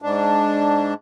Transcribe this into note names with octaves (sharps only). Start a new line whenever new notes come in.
G#2 D4